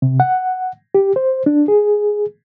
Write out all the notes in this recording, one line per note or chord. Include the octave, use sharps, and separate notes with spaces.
C3
F#5
G4
C5
D4
G#4